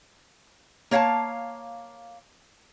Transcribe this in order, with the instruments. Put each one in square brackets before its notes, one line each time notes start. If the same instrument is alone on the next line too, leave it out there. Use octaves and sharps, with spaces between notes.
[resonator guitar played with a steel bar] A#3 C#5 F5 F#5 A5